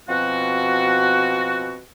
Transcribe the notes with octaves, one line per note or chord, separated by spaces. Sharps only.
B2 F3 C4 F#4